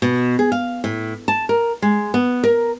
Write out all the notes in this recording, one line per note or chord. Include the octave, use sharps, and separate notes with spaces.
B2
G#4
F5
A2
A5
A#4
G#3
B3
A#4